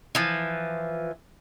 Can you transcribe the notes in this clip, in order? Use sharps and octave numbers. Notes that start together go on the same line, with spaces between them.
E3 F3